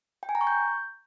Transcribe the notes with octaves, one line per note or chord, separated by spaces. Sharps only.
G5
G#5
A#5
C#6
G6